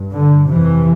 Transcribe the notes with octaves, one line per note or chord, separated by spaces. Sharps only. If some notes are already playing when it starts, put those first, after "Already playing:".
Already playing: G2
D3
F2 C3 E3